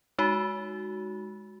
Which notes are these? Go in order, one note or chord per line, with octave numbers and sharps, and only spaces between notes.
G#3 D#4 F#4